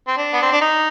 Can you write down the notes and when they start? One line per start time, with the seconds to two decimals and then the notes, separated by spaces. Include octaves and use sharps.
0.07 C4
0.17 D4
0.33 B3
0.43 C4
0.52 D4
0.61 D#4